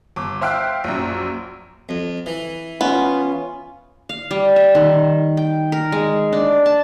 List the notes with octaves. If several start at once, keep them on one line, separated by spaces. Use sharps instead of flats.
G1 D6
C5 E5 F5 G5 E6 F#6
A#1 F#2
F2
E3
B3 C#4 F4
F5
G3
E5
D#3
G5
A#4
G#3
D4
A5